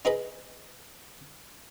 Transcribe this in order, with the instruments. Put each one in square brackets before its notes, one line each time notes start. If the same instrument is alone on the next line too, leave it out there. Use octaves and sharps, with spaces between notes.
[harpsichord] D#4 F4 G#4 B4 D#5 B5